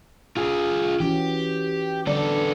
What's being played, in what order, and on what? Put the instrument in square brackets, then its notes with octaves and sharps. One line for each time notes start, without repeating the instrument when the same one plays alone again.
[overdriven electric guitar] F4 G#4
[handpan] E3 C#4 F#4 [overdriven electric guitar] G4
[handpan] D3 D5 [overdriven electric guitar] B3 A4